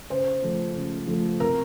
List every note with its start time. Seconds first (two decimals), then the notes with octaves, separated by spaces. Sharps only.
0.10 C#3 C5
0.42 F3 A3
0.76 C#3
1.07 F3 A3
1.40 C3 A#4